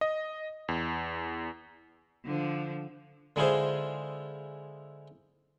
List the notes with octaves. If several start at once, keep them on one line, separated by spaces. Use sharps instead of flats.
D#5
E2
D3 F3
D3 G#3 E4 F4 G#4 C5